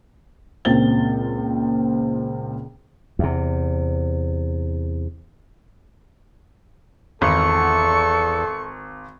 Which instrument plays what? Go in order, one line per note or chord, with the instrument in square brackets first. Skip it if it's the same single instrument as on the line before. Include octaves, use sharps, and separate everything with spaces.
[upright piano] C#2 A#2 C4 A6 G7
[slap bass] E2 C3
[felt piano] G#1 [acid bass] E2 [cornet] A4 [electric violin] C#6